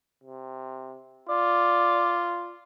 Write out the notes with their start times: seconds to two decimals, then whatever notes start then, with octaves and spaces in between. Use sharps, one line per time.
0.24 C3
1.29 F4 D5